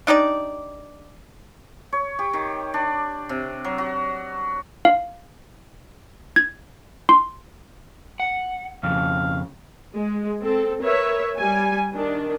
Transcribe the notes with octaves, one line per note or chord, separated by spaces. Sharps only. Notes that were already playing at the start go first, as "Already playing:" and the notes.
D4 D#4 G4 D5
C#5
G4
D#3
D4
C3
F#3
F#4
F5
G#6
C6
F#5
F2 C#3 F5
G#3
C4 A4
A#4 B4 C#5 E5
G3 G#5
D#3 D4